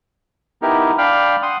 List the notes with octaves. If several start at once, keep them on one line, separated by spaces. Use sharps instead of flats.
B3 D#4 E4 G4 A#4
D4 F5 G5 B5 F6
F#5 C6 D#6